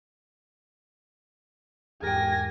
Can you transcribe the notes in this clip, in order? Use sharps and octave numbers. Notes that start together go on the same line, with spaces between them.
E2 G#2 G4 A#4 G5 G#5 A#6